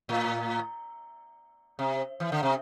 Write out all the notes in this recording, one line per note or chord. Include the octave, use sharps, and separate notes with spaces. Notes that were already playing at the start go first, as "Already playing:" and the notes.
A2
C3
E3
D3
C3